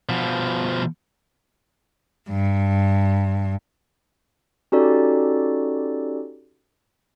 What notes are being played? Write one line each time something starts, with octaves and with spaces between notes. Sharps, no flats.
B2 F3
G2
C#4 D#4 F#4 G4 A4 D5